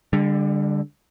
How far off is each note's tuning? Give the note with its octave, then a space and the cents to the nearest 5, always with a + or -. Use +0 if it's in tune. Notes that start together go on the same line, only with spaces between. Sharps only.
D3 +0 G3 +40